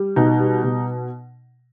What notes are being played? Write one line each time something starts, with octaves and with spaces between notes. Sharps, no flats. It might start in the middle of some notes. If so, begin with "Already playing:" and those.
Already playing: G3
B2 D#4
G3
B2